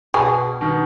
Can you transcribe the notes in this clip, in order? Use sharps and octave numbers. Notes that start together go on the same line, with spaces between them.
B2 G#4
B2 D#3